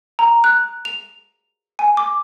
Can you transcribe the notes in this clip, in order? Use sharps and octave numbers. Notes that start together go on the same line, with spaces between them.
A#5
F#6
F7
G#5
D6